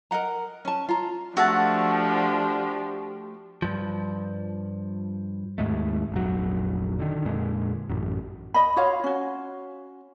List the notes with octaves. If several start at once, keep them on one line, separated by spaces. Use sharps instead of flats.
A#4 D#5 F#5 A#5
C#4 A5
F4 A#5
F3 A3 D4 F#4 G4 F#5 A5
G2 F3
D#2 G#2 G#3 A3
F1 A#1 F#3
D3 D#3
F2 A#2 D3 G#3
A1 F#2
D#5 B5
F4 F#4 C#5 F5
C#4 F#4